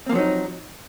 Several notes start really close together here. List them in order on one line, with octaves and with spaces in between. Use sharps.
C4 A#3 F3 F#3 D#4